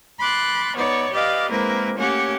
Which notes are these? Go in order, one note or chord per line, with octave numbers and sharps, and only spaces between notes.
B5 C6 D6 F#6 A6
B3 D#4 C#5 D5
G4 B4 D5 D#5 F5
G#3 A#3 C4 E4 A#4 B4
A3 A#3 C#4 G4 C#5 F#5